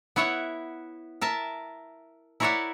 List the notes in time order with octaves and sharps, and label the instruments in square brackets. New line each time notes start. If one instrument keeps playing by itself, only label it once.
[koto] B3 E4 C#5 E5 F#5
A#4 E5 A5
E4 A#4 C#5 D5 E5 F#5